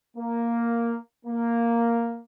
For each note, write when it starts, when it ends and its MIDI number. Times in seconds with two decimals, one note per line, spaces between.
0.16 0.96 58
1.25 2.20 58